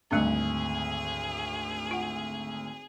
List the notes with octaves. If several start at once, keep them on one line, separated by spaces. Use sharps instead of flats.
G#1 D2 G3 A3 D4 G#4
F4 F#5